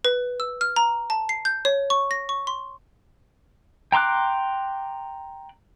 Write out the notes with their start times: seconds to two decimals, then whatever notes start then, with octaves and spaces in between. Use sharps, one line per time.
0.05 B4
0.40 E6
0.61 F6
0.76 A#5
1.10 A5
1.29 C7
1.45 G6
1.65 C#5
1.90 C#6
2.11 A#6
2.29 C#6
2.47 C6
3.92 G5 A#5 C6 D6 F#6